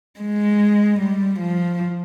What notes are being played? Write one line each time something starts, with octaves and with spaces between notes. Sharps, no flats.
G#3
G3
F3